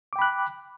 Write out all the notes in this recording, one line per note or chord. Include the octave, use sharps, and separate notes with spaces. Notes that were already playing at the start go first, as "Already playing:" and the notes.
G5 B5 D6 F#6